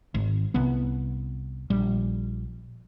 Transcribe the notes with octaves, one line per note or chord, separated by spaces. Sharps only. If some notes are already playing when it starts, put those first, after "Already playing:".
G#1
C2 B3
A#1 G3